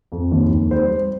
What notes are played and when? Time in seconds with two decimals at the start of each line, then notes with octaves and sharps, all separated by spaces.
0.12 F2
0.32 D#2
0.51 D#2
0.71 G3 C5
0.91 G3